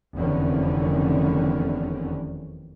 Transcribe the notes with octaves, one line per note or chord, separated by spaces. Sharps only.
F1 E2 D3 D#3 C4 C#4